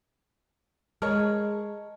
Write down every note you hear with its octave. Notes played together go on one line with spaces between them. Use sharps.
G#3 A#4 C#5 D#5 A5 F6